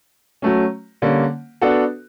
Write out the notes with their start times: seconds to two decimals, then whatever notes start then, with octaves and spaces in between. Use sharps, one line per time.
0.42 F#3 A3 C#4
1.02 D3 G3 A#3 C#4
1.62 B3 D4 F#4 A4